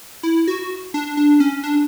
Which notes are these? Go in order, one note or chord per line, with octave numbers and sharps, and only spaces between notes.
E4
F#4
D4
D4
C#4
D4